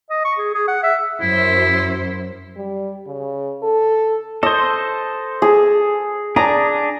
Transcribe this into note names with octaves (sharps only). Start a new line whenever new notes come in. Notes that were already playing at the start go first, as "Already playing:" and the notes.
D#5
C#6
G#4
G#4
F#5
E5
F#2 E4 C5
G3
C#3
A4
A4 C5 D#5
G#4
D4 G#4 A#5